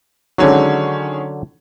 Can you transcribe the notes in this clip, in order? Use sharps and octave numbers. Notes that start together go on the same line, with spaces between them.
D3 D#3 F#3 G#3 C#4